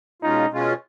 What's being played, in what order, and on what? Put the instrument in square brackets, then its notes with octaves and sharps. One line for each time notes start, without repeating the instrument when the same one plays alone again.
[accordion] B2 G#3 C#4 F4 [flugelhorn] D#4
[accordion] B2 G#3 C#4 F4